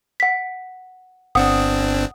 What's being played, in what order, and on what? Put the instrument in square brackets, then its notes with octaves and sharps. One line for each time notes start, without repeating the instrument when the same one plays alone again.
[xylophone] F#5 B6
[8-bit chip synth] G1 C4 D4 [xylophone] F#5 D#6